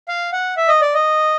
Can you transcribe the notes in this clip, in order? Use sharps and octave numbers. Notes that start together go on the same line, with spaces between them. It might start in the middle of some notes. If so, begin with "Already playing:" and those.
F5
F#5
E5
D#5
D5
D#5